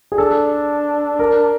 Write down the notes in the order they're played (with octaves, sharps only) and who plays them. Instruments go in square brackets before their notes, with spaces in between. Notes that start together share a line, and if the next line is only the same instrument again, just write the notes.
[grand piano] G#4
[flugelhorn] D4 [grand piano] A4
[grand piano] A#4